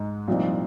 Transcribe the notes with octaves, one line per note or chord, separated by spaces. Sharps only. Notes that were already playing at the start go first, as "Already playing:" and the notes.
Already playing: G#2 G#3 D#4
C2 A#2 F3 C4 D#4